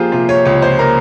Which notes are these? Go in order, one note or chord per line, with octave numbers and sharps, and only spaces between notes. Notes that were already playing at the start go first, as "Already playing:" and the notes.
Already playing: F3 A#3 F4 G4 G#4 C5
C3 F4
C#5
C#2 C#5
C5
A#3 A#4